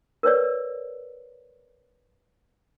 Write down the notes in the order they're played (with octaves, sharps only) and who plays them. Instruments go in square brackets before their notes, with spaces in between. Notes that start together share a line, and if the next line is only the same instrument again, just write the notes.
[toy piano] A#4 B4 C#5 D5